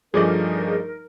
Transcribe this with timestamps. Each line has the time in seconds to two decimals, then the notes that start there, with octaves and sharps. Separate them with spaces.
0.14 G2 F3 A3 D#4 G#4 A#4 D5 D#5